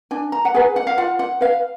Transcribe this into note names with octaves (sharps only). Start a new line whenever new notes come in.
D4 G#5
A#5
F#5
G#4 B4 G#5
F#5
F5
F4 F#5
F#5
B4 F5